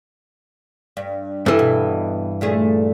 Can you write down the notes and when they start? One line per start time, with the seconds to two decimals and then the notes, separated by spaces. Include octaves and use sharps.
0.97 G2
1.46 G2 E3 A4
1.59 B2
2.41 A#2 A3 G#4